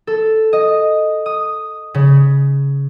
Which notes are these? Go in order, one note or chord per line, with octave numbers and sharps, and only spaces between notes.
A4
D#5
D#6
C#3